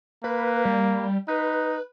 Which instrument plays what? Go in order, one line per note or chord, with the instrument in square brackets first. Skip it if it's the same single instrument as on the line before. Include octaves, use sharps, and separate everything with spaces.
[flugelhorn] A#3 [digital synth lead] B4
[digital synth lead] G3
[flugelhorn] D#4 [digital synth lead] B4